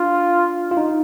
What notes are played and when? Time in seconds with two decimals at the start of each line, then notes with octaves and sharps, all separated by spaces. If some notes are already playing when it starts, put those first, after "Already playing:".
Already playing: D4 F4
0.71 F4
0.77 D#4